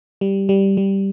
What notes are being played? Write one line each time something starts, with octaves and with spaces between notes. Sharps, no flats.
G3
G3
G3